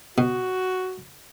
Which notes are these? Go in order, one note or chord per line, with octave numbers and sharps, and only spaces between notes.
B2 F#4